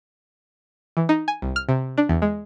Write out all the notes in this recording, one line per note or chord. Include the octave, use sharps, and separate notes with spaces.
E3
D#4
G#5
C2
F6
C3
D4
E2
G#3